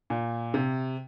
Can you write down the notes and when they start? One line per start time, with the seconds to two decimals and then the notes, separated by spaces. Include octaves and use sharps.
0.10 A#2
0.54 C3